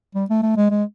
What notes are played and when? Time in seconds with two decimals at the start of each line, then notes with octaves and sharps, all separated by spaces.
0.15 G3
0.30 A3
0.42 A3
0.56 G#3
0.71 G#3